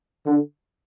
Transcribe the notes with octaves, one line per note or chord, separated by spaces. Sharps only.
D3